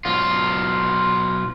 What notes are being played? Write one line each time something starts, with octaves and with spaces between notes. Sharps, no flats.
B1 F4